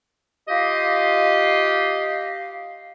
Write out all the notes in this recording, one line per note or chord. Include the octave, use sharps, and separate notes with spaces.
F4 G4 D#5 F5